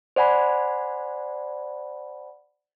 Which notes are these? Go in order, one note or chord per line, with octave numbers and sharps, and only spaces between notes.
C5 D5 F#5 G#5 B5